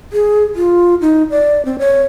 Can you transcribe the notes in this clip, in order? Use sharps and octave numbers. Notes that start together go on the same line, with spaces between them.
G#4
F4
D#4
D5
C4
C#5